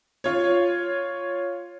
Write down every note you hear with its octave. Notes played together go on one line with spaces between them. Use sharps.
F4 C#5